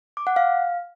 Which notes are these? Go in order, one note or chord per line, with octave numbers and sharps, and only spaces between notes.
D6
F#5
F5